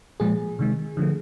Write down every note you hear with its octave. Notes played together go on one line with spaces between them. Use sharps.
A#2 F3 G#3 G#4
C3 D#3 G#3
D3 F3 A3